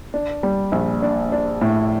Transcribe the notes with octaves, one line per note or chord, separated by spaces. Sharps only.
D4
G3
A#1
D4
D4
A2